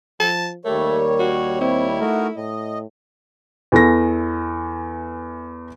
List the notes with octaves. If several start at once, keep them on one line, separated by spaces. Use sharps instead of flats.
F3 A5
D#2 G3 A3 A#4 C#5
F#4
C4 E4
A3 D#4 F#4 A#4
A2 D#5
E2 E3 A4 A#6